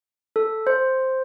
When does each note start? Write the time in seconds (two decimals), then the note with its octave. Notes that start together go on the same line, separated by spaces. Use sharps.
0.36 A4
0.67 C5